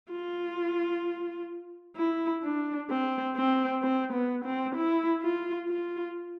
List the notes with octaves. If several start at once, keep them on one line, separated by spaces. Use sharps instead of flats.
F4
E4
D4
C4
C4
C4
B3
C4
E4
F4
F4